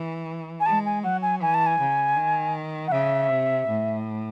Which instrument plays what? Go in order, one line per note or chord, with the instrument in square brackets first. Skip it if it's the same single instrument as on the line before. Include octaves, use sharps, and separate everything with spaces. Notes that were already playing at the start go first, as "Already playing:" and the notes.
Already playing: [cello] E3
[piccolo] G#5
[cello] G#3 [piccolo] A5
[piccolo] G#5
[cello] F#3 [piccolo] F#5
[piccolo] G#5
[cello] E3 [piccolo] G#5
[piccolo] A5
G#5
[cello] C#3
D#3
[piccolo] F#5
[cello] C#3 [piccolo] E5
[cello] C3
A2